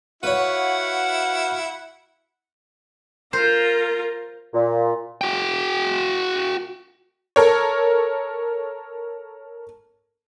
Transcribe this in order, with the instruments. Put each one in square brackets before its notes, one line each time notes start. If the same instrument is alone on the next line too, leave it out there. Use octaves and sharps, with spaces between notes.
[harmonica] E4 [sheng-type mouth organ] F#4 F5 [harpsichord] B4 C#5 [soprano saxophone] F#5
[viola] F4 A#4 [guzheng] C5
[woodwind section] A#2
[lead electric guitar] F#4 G5
[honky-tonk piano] A4 A#4 C#5